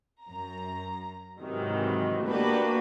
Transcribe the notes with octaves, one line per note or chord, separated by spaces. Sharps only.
F#2 A#5
G#2 C3 D#3 E3 F#3
A#3 B3 D4 F#4 G4 B4